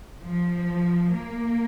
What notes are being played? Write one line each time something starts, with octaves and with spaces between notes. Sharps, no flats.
F3
A#3